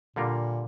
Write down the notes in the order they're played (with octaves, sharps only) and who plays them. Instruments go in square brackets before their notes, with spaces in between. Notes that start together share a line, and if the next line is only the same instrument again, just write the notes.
[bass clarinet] A#2 [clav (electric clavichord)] D3 G3 A#3 F4 A#4